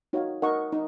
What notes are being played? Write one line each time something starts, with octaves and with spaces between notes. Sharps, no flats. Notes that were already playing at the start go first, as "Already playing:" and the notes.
D#4 F#4 C#5 F5
D#4 A#4 D#5 F#5 C#6
D#4